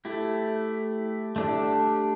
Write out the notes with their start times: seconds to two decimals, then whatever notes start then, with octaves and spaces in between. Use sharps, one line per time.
0.05 A3 E4 G4
1.36 A3 D4 G4